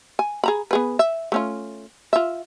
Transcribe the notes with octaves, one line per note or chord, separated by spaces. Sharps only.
G#5
G#4 A#5 B5
B3 G#4 B4
E5
A3 C#4 F4
F4 E5